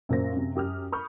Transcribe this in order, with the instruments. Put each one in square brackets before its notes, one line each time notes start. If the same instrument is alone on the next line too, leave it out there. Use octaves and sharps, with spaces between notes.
[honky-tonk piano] F#2 A#2 C5 A#6
F#2 C3
F#2 G4 D#6 F6
B5 C#6 D#6 F6 G6